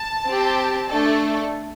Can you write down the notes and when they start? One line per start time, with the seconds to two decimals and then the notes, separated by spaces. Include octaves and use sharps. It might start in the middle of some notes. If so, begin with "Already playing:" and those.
Already playing: A5
0.27 C4 G4
0.89 A3 D4 A4